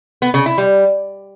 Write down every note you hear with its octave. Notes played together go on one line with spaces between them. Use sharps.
B3
C#3
E4
G3